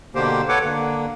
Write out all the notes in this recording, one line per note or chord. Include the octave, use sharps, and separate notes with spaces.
B2 D3 A#3 G4 C5
A4 B4 C#5 F#5 D6
D3 A#3